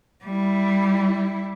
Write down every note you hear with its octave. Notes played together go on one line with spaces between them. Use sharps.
G3 E4